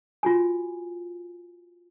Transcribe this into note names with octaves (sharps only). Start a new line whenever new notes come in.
F4 F#4 G#5